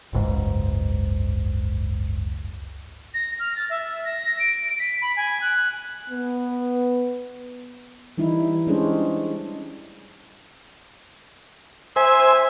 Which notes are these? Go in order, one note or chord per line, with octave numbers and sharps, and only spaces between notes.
F#1 C#2 G#2
A#6
F6
A6
E5
A#6
D7
B6
B5
G#5
F#6
B3
E3 G3 D#4 E4
G3 G#3 C#4 D4 G#4 C5
C5 E5 G#5